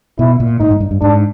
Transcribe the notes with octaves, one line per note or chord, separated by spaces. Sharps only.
B2 E4
A#2
A2 D#4
G#2
G2
G2
G#2 D4